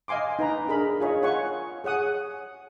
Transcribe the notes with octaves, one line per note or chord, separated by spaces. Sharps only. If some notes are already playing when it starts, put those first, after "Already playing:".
D#5 F5 G#5 C6 D6
D#4 B4 A#5 B5
D4 G#4 A#4 B5
F4 G#4 C#5 D#5
F4 C#5 F#5 G#5 C#6
G#4 C#5 F#5 D#6